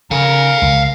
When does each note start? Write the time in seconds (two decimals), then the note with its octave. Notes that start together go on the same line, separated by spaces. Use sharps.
0.11 C#3 A#4 F5 G#5
0.62 C#2